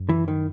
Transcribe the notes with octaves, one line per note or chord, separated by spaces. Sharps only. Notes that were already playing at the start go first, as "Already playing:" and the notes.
Already playing: F#2
E3
D#3